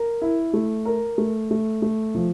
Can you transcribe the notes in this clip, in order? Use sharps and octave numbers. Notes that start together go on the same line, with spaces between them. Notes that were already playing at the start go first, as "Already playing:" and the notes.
Already playing: A#4
E4
A3
A#4
A3
A3
A3
F3